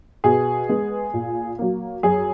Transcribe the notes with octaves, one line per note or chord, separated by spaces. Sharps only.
B2 G#4
G#3 B3
A#2
F#3 A#3
F#2 G#4